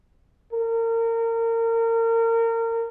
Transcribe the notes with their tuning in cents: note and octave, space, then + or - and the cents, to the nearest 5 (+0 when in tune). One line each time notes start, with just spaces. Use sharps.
A#4 -30